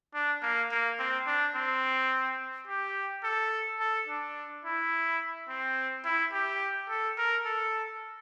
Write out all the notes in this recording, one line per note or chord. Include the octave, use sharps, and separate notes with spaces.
D4
A#3
A#3
C4
D4
C4
G4
A4
A4
D4
E4
C4
E4
G4
A4
A#4
A4